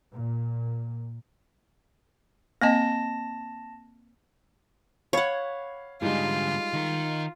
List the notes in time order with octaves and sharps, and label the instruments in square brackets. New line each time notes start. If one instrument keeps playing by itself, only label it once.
[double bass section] A#2
[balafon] A#3 C4 D#5 [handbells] A5 A#6
[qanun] C#5 F#5 [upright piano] F5 B5 G#6
[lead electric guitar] G#2 D3 [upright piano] G3 G#3 D#4 [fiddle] F4
[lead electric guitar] D#3 A#4